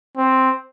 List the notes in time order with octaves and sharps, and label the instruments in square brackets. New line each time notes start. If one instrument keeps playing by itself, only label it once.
[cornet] C4